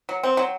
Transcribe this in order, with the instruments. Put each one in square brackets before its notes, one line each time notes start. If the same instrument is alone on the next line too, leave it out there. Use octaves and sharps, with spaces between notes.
[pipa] F#3
C4
F#3